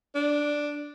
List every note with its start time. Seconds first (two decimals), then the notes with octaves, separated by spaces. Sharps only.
0.15 D4